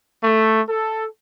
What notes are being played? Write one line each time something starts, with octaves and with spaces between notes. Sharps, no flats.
A3
A4